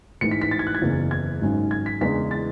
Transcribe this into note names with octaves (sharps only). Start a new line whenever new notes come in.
A1 G#2 E3 C#7
B6
B6
A6
G#6
F#6
G#6
F#1 E2 C#3 E3
G#6
G#1 G#2 F#3 C#4
G#6
B6
E2 C#3 E3 G#3 D4 B6
A6